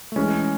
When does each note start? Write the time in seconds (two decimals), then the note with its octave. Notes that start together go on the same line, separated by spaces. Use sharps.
0.12 A3
0.16 E3 G#3 C#4